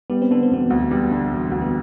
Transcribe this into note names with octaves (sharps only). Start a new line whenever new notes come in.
G3 B3
C4
D3 B3
C4
E1 B3
D2
G3 B3
D3
E1
D2
B3